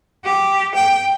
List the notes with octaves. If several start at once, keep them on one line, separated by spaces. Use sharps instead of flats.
G4
G5